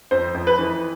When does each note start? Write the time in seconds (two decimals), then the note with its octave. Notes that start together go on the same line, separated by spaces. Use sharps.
0.11 F2 C5
0.34 F2
0.47 B4
0.59 E3